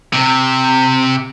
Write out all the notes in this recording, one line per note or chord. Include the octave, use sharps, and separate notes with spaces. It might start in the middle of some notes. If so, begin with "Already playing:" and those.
C3